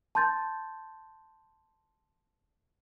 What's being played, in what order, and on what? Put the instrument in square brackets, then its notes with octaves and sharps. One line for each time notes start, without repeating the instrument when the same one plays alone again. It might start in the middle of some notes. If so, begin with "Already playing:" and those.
[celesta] A5 C6 G6 A6